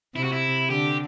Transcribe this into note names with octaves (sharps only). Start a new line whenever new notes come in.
C3 E4
F#4
E4
D3 G4